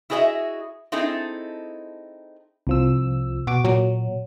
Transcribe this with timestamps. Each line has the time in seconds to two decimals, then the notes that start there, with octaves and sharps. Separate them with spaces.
0.10 E4 F#4 G#4 B4 D#5 E5
0.92 C4 D#4 E4 G#4 A4
2.67 C2 F3 E6
3.47 B2 F#4 D6
3.65 A#2 F#3